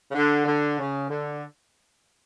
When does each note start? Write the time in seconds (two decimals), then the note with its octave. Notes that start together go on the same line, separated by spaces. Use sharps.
0.09 C#3
0.15 D3
0.46 D3
0.78 C#3
1.10 D3